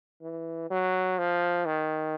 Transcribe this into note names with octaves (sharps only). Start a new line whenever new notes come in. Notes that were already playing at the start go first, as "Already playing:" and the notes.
E3
F#3
F3
D#3